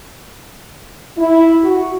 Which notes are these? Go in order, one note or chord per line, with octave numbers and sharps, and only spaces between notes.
E4
F#4